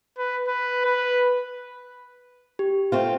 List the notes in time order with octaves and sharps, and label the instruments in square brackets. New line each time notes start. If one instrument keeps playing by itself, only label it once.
[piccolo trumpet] B4
B4
B4
[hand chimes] G4
[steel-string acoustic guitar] A3 C4 F4